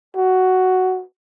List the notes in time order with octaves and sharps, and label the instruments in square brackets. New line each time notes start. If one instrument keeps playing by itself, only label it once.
[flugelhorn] F#4